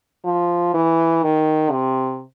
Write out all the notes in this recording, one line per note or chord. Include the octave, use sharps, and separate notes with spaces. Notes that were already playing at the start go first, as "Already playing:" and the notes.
F3
E3
D#3
C3